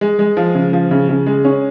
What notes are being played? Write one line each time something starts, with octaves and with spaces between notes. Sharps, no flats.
G#3
G#3
F3
C#3
F3
C#3
C#3
G#3
C#4